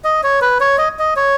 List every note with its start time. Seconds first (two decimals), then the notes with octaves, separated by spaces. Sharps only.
0.04 D#5
0.23 C#5
0.42 B4
0.60 C#5
0.78 D#5
0.99 D#5
1.16 C#5